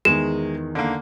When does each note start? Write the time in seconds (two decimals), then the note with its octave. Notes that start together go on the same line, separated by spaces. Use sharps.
0.05 E2 D#3 G#3 E7
0.75 D3 A#3